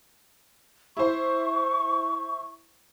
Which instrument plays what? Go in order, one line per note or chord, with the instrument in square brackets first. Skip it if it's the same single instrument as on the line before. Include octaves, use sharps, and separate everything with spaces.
[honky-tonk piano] E4 C5 [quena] C#6